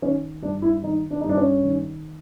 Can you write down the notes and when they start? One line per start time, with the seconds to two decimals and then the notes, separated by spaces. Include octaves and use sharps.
0.02 D#3 C#4
0.42 G2 D4
0.62 E4
0.83 D#3 D#4
1.10 D4
1.21 D#4
1.24 G2
1.29 D4
1.37 C#4
1.64 D#3